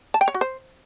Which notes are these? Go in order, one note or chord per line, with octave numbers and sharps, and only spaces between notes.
A5
G5
C#5
F#4
C5